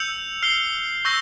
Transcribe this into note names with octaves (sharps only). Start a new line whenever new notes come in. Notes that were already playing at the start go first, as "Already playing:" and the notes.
Already playing: E6 G6 C#7 F7
F6 C7 G7
C#6 E6 G6 A#6